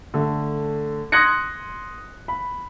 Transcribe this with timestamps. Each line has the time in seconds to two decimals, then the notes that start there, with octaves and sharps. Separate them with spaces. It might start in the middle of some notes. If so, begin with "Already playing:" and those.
0.14 D3 A3
1.12 C6 D#6 F#6 G#6 A#6 C#7
2.28 B5